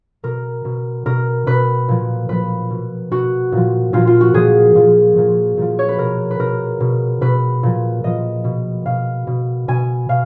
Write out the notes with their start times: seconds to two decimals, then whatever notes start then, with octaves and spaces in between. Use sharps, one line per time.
0.23 B2 A#4
0.65 B2
1.06 B2 A#4
1.47 B2 B4
1.88 A#2 F3
2.29 A#2 F3 B4
2.70 B2
3.11 B2 F#4
3.52 A#2 F3
3.93 A#2 F3 F4
4.07 F4
4.21 F#4
4.34 A#2 F3 G#4
4.75 A#2 F3
5.16 A#2 F3
5.57 A#2 F3
5.79 C#5
5.89 B4
5.98 B2 A#4
6.31 B4
6.39 B2 A#4
6.80 B2
7.21 B2 B4
7.63 A#2 F3
8.04 A#2 F3 D#5
8.44 B2
8.86 B2 F5
9.27 B2
9.68 B2 G#5
10.09 B2 F5